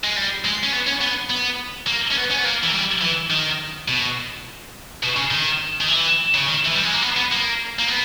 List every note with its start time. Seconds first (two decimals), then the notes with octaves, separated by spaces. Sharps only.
0.04 G#3
0.16 G3
0.45 G#3
0.63 C#4
0.73 B3
0.87 C#4
1.02 B3
1.30 B3
1.87 A#3
2.11 C#4
2.17 B3
2.31 C#4
2.38 B3
2.45 A#3
2.63 E3
2.74 G3
3.02 E3
3.30 D#3
3.88 B2
5.03 B2
5.17 C#3
5.31 D#3
5.81 D#3
5.88 E3
6.34 C#3
6.45 D#3
6.65 E3
6.74 G3
6.83 G#3
6.93 A#3
7.02 B3
7.17 B3
7.32 A#3
7.79 A#3
7.88 B3